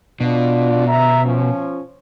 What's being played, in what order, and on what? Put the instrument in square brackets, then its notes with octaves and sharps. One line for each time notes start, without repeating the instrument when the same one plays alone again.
[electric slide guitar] B2 [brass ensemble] D4 F4
[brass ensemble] E5 A#5
F3 C#4